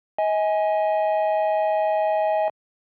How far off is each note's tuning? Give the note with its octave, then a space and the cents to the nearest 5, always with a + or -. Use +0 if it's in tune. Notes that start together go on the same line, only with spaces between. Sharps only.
D#5 +35 G#5 +0